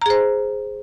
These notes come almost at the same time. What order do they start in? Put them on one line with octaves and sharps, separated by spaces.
A#5 G#4 C5